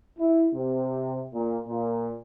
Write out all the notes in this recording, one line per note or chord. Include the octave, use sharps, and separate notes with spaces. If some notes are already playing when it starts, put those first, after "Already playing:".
E4
C3
A#2
A#2